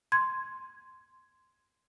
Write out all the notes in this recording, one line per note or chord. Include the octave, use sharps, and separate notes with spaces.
C6 G#6